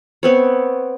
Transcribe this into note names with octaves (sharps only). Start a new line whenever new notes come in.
B3 C4 C#5